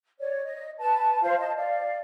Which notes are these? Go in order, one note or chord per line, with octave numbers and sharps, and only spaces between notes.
C#5 D5
D#5
B4 A5
F4 C5 F5
D#5 A5
D5 F5